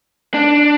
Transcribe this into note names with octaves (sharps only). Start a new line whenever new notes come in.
D4